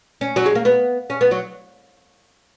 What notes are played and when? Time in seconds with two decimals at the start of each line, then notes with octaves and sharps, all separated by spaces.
0.21 C#4
0.36 F#3
0.46 G#3
0.55 A#3
0.65 B3
1.10 C#4
1.21 B3
1.31 F#3